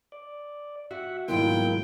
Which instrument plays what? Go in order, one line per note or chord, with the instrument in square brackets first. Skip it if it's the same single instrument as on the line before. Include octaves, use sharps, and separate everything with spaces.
[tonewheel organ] D5
[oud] F#4 [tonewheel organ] E5 F#5
[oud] G#2 F#3 F4 [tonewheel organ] B2 D#3 A#3 [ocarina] E4 [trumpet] G5